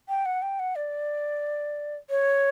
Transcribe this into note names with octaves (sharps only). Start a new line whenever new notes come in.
G5
F#5
G5
F#5
D5
C#5